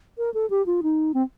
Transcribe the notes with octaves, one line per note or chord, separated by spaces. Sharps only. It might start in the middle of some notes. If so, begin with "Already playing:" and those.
A#4
A4
G4
F4
D#4
C4